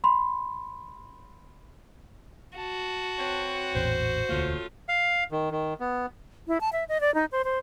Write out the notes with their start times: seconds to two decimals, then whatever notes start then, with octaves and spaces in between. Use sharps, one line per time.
0.04 B5 C6
2.58 F#4 A5
3.19 C4 B4 C#5
3.75 A1 E2 A#2 C5
4.29 E1 D2 A3 A#3 C#4 F4
4.89 F5
5.32 D#3
5.51 D#3
5.80 B3
6.48 E4
6.61 A5
6.73 E5
6.89 D#5
7.01 D5
7.15 D#4
7.32 C5
7.44 C5